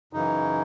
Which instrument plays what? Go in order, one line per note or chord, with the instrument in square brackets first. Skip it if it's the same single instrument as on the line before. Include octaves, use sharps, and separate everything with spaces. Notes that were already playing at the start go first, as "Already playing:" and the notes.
[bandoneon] F#2 C#3 E3 D#4